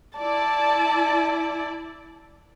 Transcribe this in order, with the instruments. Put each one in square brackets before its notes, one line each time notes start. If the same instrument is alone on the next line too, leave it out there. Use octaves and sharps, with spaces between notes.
[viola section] E4 D5 [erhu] A5